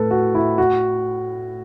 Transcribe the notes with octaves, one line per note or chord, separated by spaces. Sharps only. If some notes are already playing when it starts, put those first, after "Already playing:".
Already playing: A2 A4 B4
F#4
E4
F#4